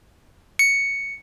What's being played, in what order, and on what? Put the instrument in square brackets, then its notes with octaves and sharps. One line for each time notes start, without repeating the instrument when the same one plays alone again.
[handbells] C#7